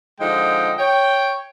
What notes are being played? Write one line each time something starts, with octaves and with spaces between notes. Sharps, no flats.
D3 F3 G#3 D#4 D#5 G5
C#5 G5